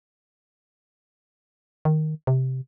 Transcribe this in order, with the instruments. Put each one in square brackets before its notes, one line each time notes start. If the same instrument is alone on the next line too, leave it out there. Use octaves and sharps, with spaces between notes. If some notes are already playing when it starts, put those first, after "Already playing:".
[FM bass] D#3
C3